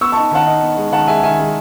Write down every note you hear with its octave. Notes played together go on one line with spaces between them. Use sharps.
B3 C#6 E6
A5 C#6
D#4
D#3 F#5 A5
D#4
B3
G#3
D#3 F#5 A5
G#3 E5 G#5
D#3 E5 G#5
G#3